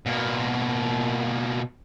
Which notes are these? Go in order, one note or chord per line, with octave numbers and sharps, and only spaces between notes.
B2 A#3